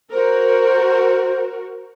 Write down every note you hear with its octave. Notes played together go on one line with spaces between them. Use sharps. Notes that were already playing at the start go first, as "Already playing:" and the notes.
F#4 A#4 C5